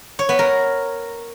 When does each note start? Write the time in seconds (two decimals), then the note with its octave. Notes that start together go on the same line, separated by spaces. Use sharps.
0.19 C#5
0.29 B3
0.39 A#4